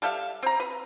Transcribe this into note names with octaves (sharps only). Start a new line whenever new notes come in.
G3 A4 E5 F5
C4 A#5
B4